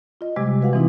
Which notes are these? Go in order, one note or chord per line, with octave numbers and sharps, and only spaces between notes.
F4 D#5
C3 G3 G#3 G4 D6 G#6
F#4 B4 F5 F#5
E3 C4 D#4 E4